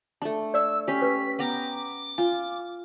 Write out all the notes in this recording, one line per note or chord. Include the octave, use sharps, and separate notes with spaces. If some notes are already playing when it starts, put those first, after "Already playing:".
A3 D4 A5
D5 E6
C#4 G4 B6
B4
B3 G5 A#5 D6
F4 G#5